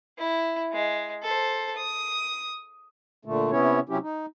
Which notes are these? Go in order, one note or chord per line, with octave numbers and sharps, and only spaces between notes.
E4
G#3
A4 C5
D#6
A#2 D3 A3
C3 B3 C#4 E4 C#5
C3 F#3 C#4 E4 G4
D#4